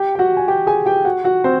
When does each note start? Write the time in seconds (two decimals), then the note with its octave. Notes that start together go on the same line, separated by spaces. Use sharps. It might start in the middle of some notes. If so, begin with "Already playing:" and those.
Already playing: G4 G5
0.15 G5
0.19 F#4 F#5
0.37 G#5
0.48 G4 G5
0.67 G#4 G#5
0.86 G4 G5
1.05 F#4 F#5
1.24 F#4 F#5
1.44 C4 C5